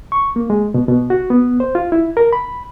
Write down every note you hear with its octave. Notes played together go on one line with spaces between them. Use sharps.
C#6
A#3
G#3
B2
B2
F#4
B3
C5
F4
E4
A#4
B5